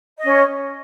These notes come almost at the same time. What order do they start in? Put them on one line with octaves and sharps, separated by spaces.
D#5 C#4 C#5